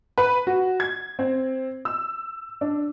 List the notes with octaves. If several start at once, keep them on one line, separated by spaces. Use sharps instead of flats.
B4
F#4
G#6
C4
E6
D4